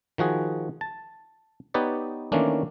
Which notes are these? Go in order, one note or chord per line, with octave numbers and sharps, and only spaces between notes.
D#3 F3 F#4 G#4
A5
B3 D#4 G4 B4 C#5 D5
D#3 E3 A3 A#3 C#4 D4